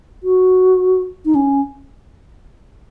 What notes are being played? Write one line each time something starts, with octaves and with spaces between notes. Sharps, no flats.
F#4
D#4
C#4